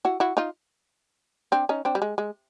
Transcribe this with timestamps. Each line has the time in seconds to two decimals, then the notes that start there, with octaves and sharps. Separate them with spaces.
0.05 E4 F#4
0.20 E4 F#4
0.37 D#4 F4
1.52 C4 D4
1.69 C#4 D#4
1.85 C4 D4
1.95 G3
2.02 G#3
2.18 G#3